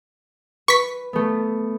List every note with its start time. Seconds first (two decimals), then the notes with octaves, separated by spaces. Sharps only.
0.68 B4 C#6 B6
1.13 A3 B3